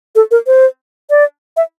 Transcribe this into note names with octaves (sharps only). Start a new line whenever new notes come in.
A4
A#4
C5
D5
E5